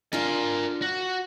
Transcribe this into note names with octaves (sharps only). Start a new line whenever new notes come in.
D4 F4 A#4 G#5
F#4